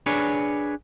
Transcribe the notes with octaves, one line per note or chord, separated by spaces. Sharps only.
D4 G#4 B4 C#5